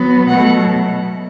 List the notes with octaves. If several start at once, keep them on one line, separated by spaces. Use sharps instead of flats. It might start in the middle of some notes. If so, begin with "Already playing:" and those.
Already playing: F#3 B3
B2 F#3 A3 F#5